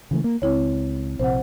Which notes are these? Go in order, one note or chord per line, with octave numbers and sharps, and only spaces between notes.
C#3 E3 A3
A#3
C#2 C4 E4 C#5
A#1 C3 C5 F#5